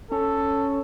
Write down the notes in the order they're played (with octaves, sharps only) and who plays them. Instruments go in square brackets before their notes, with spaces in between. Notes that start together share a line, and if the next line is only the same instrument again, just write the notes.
[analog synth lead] C#4 [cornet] A4